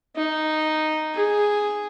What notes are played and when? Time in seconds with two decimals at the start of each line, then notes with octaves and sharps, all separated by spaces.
0.16 D#4
1.15 G#4